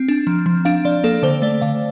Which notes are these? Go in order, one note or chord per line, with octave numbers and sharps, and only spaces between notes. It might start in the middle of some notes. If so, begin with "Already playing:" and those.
Already playing: C4
D4
F3
F3
D4 F5
F3 D5
A#3 A4
D3 C5
A3 D5
D3 F5